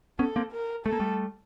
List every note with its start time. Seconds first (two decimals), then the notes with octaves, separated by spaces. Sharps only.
0.19 B3 C#4 A4
0.36 A#3 C4
0.52 A#4
0.86 A3 A4
0.93 A#3
1.00 G3 A3